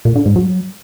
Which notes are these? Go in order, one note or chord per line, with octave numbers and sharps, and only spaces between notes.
A#2
D3
G#2
F#3